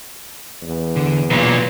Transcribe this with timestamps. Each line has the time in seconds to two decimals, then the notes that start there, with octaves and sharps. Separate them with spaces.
0.62 E2
0.96 D3
1.30 B1 A#2 B4 C#5